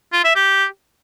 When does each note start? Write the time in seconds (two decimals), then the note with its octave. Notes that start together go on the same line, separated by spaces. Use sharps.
0.13 F4
0.24 E5
0.36 G4